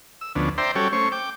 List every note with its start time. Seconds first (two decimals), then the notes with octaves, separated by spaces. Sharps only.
0.21 E6
0.35 D2 F3 B3 C#4 D4
0.58 C5 D5 E5 G5 A#5 C6
0.76 G3 C#4 F#4 A4 C#5 G5
0.93 A3 C#4 C5 C#6
1.12 G5 D6